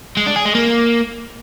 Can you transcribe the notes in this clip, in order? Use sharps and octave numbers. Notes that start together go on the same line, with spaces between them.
G#3
D4
G#4
G#3
A#3